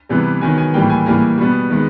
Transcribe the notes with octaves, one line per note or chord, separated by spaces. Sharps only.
C3 E3 G3 B3
D#3 F#3 B3 G#5
G#5
A2 E3 G3 A#3 G5
G#5
A2 E3 G3 A#3 G#5
B2 G3 B3
D#3 G#3 B3